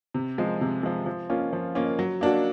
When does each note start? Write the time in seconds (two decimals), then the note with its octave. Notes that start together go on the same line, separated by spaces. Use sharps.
0.14 C3
0.38 F3 G#3
0.61 C3
0.83 F3 G#3
1.06 F3
1.30 A#3 C#4 F4
1.53 F3
1.75 A#3 C#4 F4
1.99 F#3
2.21 A#3 D4 F#4